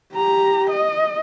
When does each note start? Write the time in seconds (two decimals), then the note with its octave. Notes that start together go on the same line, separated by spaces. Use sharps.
0.14 G4 A#5
0.70 D#5